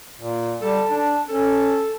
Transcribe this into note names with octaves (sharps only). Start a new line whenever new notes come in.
A#2
G3 A4 A5
D4
C#4 A4